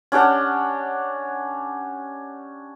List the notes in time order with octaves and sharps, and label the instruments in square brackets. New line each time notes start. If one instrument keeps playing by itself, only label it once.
[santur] C#4 D4 G4 F#5